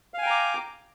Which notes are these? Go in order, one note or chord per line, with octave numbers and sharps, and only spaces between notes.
F5 G5 G#5 A#5 D6